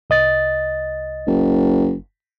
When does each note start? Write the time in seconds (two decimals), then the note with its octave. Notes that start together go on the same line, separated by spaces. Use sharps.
0.10 C2 D#5 A6
1.27 F#1